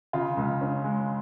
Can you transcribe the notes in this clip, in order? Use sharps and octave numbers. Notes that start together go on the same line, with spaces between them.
C#3 F4
C#2
C#4
G#3